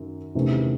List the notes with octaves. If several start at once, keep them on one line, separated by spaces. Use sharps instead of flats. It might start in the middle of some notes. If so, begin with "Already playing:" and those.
Already playing: F#2 D#3
E2 C3 D#3 A3 C#4